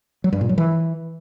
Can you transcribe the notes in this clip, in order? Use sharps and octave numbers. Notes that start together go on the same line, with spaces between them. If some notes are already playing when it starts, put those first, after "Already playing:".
F#3
G2
A#2
F#3
E3